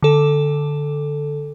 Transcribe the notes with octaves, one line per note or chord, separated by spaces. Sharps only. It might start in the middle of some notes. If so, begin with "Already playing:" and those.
D3 A4